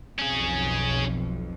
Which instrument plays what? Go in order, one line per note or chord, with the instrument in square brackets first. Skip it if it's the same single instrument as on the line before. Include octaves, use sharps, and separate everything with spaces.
[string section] B1 F2 [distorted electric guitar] C#4 G#4